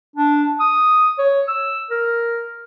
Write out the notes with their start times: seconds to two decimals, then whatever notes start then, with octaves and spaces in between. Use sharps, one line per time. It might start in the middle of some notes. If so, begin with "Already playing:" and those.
0.16 D4
0.60 D#6
1.18 C#5
1.48 E6
1.91 A#4